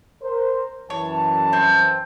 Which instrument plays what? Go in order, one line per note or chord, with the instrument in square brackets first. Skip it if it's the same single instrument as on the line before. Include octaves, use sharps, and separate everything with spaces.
[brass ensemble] A#4 C5
[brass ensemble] F#2 E3 A5 [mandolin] C#5
[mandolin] C4